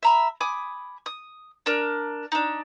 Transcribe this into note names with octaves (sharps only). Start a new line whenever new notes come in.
E5 A#5 B5
G#5 B5 D6 D#6
D#6
D4 A#4
D4 D#4